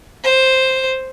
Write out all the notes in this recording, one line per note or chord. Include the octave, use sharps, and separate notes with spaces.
C5